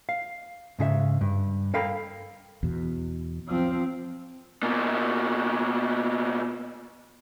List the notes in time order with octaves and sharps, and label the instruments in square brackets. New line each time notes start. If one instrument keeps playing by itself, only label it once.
[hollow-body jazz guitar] F5
G#2 C#3 G#4 E5
G2
A4 A#4 F5 G5 B5
[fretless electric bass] E2 B2
[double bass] F3 C4
[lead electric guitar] B2 A#3